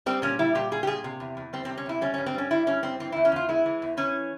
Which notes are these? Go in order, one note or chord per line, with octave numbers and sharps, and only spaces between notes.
G3 C4
A#2 C#4
G3 E4
A#2 G4
G3 G#4
G4
A#2 G#4
C3
E2
E2
G3 C4
C4
C3
C#4
E2 E4
G3 C#4
C#4
G2
C4
G3 C#4
G2 E4
G3 C#4
G2 C4
E3 C4
E4
E2
C#4
E2 F4
G#3 E4
E3
E2
E3 C#4